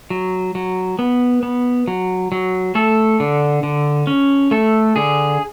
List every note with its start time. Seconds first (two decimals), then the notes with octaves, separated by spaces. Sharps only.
0.10 F#3
0.55 F#3
0.99 B3
1.43 B3
1.88 F#3
2.32 F#3
2.75 A3 A4
3.20 D3
3.63 D3
4.07 C#4
4.51 A3 A4
4.96 D3 G#4